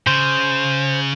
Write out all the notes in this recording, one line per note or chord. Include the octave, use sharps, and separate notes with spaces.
C#3 C5